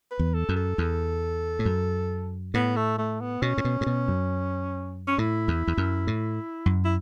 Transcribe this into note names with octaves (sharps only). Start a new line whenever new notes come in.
B4
E2
A4
F#2
A4
E2
A2
F#2
A2 B3
A3
A3
B3
B2 C#4
A2
B2
A2
B2
F#2
C#4
A2 E4
E2
E2
F#2
A2
F#2
E4